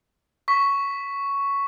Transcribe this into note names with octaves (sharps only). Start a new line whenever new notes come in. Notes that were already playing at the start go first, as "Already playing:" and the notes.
C#6 B6